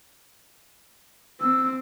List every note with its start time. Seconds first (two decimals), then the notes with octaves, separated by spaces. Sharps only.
1.41 C4 E6